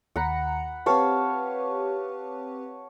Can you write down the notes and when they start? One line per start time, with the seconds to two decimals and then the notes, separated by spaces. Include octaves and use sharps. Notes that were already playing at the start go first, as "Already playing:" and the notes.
0.16 D#2 F#5 A#5 B5 C#7
0.86 C4 G4 B4 C#5 F5 A5